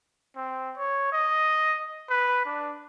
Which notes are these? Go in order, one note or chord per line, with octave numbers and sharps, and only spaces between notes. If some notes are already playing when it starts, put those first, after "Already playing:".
C4
C#5
D#5
B4
D4